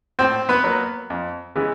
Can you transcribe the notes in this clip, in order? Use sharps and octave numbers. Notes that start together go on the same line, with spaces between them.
A2 C4 C5
B3 B4
F#3 A#3
F2
C#3 E3 G#3 B3